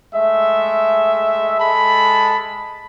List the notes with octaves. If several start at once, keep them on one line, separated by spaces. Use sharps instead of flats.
G#3 A3 E5
G#3 A4 A5 B5